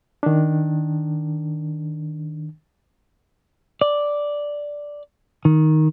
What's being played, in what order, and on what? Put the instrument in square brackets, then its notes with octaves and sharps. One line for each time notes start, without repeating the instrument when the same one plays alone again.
[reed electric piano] D#3 D4
[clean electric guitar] D5
D#3